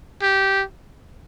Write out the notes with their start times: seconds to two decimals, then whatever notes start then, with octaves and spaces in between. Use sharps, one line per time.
0.22 G4